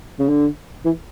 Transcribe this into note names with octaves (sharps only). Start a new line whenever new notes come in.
C#3
D3
E3